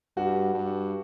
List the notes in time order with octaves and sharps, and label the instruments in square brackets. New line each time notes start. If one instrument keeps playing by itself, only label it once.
[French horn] G2 [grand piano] F#4
[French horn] G2